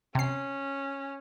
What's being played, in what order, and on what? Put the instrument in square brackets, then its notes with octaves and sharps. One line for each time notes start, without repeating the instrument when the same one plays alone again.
[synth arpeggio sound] C3 C7 [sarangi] C#4